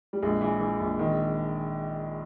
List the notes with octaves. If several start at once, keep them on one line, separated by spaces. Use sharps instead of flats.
G3
A#1 G#3
E3
E3
A#1
D#3